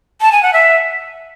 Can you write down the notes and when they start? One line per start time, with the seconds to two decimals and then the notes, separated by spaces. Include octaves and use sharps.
0.21 A5
0.32 G#5
0.43 F#5
0.53 E5